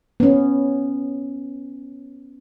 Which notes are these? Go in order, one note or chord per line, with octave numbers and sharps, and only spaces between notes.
B3 C#4